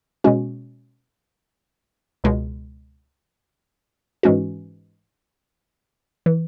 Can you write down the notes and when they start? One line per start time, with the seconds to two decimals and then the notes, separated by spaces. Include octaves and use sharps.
0.24 B2 G#3 C#4 F#4
2.24 C#2 B2 G#3
4.23 G#2 E3 G#3 C#4 F#4
6.26 E3